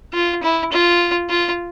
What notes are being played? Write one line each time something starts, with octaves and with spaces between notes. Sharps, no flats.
F4
E4
F4
F4